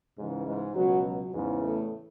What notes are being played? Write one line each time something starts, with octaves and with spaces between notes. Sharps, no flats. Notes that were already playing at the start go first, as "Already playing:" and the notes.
C#2 G#2 C#3 E3 G#3
G#2 G#3
C#2 B2 F#3
F#3
E2 G#2 C#3 E3 G#3
A2 A3